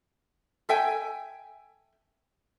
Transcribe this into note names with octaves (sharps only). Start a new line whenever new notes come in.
A4 E5 G5 G#5